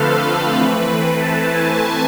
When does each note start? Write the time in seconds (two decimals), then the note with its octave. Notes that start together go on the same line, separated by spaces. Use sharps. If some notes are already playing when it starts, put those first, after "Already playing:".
Already playing: D3 F3 A3 C4 A4 B4 F5
0.57 E3 A3 C4
1.20 A5
1.53 G#5